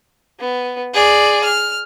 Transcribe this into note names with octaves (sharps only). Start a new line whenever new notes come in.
B3
G#4 D5
F6